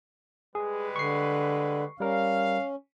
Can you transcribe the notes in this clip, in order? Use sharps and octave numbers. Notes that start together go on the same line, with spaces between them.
G3 G#3 G#4 B4
D3 C#6 C7
G3 C#4 A#4 F5